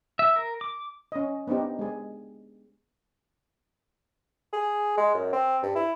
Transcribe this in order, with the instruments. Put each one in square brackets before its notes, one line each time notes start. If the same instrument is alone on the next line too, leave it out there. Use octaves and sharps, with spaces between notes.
[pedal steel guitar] E5
A#4
D6
[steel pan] C#4 D#5
B3 C4 D4 D#4 G4
G#3 G#4
[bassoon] G#4
G#3
F#2
C4
G2
E4